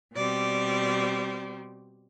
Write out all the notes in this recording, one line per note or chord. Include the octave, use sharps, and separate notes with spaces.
B2 G3 C4 D5